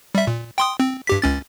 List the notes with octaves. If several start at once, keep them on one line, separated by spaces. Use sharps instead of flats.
G3 E5
A#2
G5 C6 D#6
C4
G2 G4 B6
C#2 C#4 A6